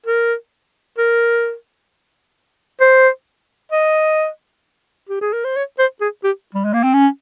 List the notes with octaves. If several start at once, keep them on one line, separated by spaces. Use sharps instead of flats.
A#4
A#4
C5
D#5
G4
G#4
A#4
C5
C#5
C5
G#4
G4
G3
G#3
A#3
C4
C#4